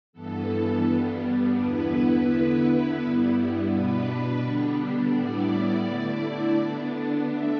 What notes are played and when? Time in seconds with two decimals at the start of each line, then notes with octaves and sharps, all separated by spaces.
0.13 G2 E3 B3 A4
0.84 G2 G3 B3 D4
1.56 E2 D3 B3 E4 B4
2.27 D3 B3 E4 B4
2.99 G2 G3 B3 E4
3.70 B2 B3 D4 B4
4.42 D3 G3 B3 D4
5.13 A2 G3 B3 E4 D5
5.85 D3 A3 E4 D5
6.57 D3 B3 D4
7.29 A3 D4 E5